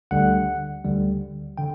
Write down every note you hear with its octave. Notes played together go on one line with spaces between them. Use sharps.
D2 D3 G3 F#5
D2 D3 G3
D3 G5